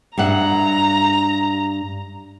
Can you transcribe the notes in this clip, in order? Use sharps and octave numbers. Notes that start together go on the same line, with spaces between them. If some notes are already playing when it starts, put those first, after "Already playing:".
G2 E5 F#5 A#5